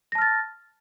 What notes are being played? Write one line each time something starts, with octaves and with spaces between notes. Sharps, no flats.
A5 F6 A6 A#6